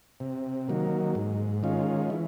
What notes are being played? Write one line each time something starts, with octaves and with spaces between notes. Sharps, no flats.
C3
D#3 F#3 A#3
G#2
D#3 G#3 C#4 F4
E3